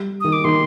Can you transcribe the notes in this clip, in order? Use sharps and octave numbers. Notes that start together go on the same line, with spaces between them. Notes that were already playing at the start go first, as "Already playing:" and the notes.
Already playing: G3
D#3 D#6
D6
D#3 C6